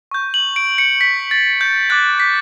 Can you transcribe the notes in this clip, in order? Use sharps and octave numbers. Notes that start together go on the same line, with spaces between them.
C#6 G6
F#7
D7
C#7
B6
A6
G6
D6 F#6 A6
B6